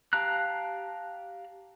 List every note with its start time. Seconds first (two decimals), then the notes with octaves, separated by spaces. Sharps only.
0.13 G4 F5 A5 A#5 F#6